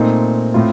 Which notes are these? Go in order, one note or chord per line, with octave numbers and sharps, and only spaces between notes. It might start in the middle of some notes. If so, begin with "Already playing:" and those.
Already playing: A#2 A3 C4 D#4
A2 A3 C4 F4